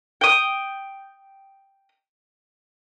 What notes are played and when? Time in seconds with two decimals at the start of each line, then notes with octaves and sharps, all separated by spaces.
0.21 G5 D#6